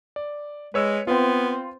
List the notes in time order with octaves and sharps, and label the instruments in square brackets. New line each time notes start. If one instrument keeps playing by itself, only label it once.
[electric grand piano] D5
[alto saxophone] G#3 [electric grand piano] B4 C#5 E6
[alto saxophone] B3 [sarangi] C4 [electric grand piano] F4 B4